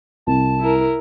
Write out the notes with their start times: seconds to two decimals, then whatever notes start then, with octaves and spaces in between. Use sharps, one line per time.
0.27 C2 A5
0.60 E4 A#4